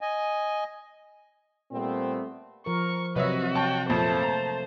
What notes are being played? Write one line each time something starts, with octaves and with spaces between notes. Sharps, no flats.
D#5 G#5
A#2 G3 A3 B3 C4
F3 A#4 C#6
C3 F#3 F#4 B4 C#5 D#5 E5
C#5 G5 A5 C#6
F2 A#2 A3 A#3 C5 A5
A#5